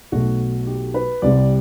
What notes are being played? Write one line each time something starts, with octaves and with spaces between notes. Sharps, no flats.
B1 B2 F#3 A3 F#4
G4
B4
C2 C3 G3 D5